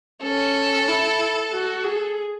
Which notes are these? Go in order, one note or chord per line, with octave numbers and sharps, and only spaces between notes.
C#4 A4
E4
F#4
G#4